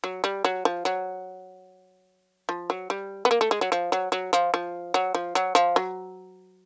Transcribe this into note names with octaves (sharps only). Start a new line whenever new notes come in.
F#3
G3
F#3
F3
F#3
F3
F#3
G3
B3
A#3
A3
G#3
F#3
F3
F#3
F#3
F3
F3
F#3
F3
F#3
F3
F#3